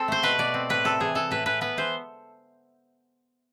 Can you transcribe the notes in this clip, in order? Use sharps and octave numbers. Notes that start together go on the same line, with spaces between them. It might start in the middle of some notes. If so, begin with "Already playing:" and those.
Already playing: C4 A4
A3 C5
B2 B4
B2 D5
C4
A2 B4
C3 A4
E3 G#4
E3 A4
A2 B4
E3 B4
B3 B4
E3 C5